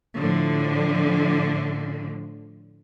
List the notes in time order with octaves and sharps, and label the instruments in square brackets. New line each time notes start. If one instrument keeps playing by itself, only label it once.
[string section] A2 D3 F3